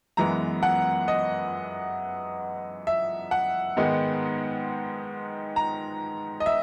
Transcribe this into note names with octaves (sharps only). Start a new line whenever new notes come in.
F#2 E3 G#3 B3 A#5
F#5
D#5
E5
F#5
G#2 D#3 G#3 B3
A#5
D#5
E5